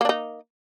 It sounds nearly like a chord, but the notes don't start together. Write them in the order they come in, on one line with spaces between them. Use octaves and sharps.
A#3 D4 D#4